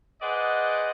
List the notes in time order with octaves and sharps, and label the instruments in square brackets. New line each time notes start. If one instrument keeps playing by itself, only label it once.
[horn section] G#4 B4 C5 D5 D#5 F#5